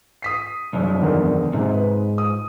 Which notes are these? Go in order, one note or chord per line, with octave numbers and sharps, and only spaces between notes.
D#6 B6 C7
C2 F#2
E2 D3 D#3
G#2 C3
B4
D#6